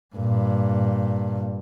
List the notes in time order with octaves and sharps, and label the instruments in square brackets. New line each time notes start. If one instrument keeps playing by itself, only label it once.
[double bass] G2 A#2